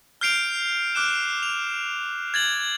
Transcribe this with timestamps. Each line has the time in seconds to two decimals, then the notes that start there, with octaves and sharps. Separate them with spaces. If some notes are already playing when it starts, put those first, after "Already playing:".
0.21 F6 G6 C7 D7 F7
0.95 D6 F6 F#6 E7
1.43 F7
2.34 G#6 A6 F#7